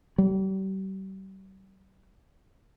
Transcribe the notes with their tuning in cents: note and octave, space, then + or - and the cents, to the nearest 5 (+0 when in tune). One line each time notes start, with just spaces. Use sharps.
G3 -40